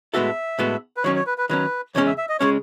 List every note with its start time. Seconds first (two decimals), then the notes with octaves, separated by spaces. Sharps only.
0.13 A2 G#3 B3 F#4 A4 E5
0.59 A2 G#3 B3 F#4 A4
0.97 B4
1.04 D#3 F#3 C#4 C#5
1.16 C#5
1.27 B4
1.38 B4
1.50 D#3 F#3 C#4 B4
1.95 E2 C#3 G#3 C#4 C#5
2.06 E5
2.18 E5
2.29 D#5
2.40 C#3 G#3 C#4 C#5